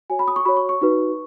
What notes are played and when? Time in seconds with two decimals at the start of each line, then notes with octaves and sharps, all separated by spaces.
0.10 F#4 C#5 G#5
0.19 B5
0.28 D#6
0.36 C#6
0.45 F#4 C#5 B5
0.57 C#6
0.69 C#6
0.81 D#4 F#4 B4